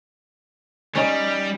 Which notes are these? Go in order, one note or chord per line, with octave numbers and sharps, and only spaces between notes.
G3 C#4 D#4